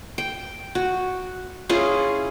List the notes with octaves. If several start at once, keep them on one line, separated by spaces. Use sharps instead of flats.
G5
F#4
C#4 E4 F4 G#4